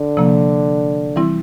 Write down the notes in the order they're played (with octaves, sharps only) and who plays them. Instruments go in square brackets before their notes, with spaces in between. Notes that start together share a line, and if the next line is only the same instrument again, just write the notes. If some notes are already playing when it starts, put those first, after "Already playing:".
Already playing: [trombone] D3
[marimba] C3 F3 A#3
E3 G3 C4 E4